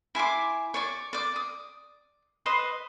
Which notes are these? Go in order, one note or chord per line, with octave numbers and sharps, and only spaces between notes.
E4 G#5 C6 D6
C#5 D5 C#6
D5 D6
D#6
B4 C5 D#5 C6